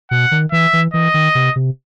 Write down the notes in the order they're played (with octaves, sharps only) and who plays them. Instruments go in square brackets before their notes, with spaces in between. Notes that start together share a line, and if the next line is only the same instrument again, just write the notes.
[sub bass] B2 [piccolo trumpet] F#5
[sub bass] D#3
[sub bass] E3 [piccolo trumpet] E5
[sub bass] E3
[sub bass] E3 [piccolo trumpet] D#5
[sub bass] D#3
C3
C3